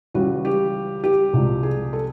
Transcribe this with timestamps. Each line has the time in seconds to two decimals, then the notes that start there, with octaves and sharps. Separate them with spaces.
0.14 C#2 C#3 E3 G3 F#4
0.45 G4
1.04 G4
1.33 C2 C3 F3 G#3
1.63 G#4
1.93 A4